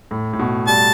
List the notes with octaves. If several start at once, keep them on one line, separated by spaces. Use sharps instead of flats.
A2
A2
B2
G3 A5